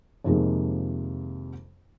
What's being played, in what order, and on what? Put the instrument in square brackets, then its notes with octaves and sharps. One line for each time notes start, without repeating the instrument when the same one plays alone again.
[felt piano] F2 C3 D#3 F3 G#3 A#3